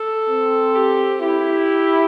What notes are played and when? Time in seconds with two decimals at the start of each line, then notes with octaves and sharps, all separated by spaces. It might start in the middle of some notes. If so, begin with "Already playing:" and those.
Already playing: A4
0.29 C4
0.75 G4
1.21 E4 G4